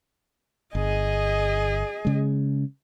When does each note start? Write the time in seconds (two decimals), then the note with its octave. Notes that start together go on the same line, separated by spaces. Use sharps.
0.75 G1 G#4 D#5
2.05 C#3 G#3